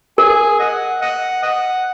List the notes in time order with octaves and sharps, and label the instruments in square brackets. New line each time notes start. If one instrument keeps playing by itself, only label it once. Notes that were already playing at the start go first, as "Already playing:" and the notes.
[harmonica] G#4 [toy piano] A#4
[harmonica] D#5 F#5
D#5 F#5
D#5 F#5